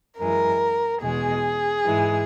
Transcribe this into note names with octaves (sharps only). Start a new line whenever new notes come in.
F#2 E3 G#3 A#4
E2 B2 G#3 G#4
G#2 E3 G#3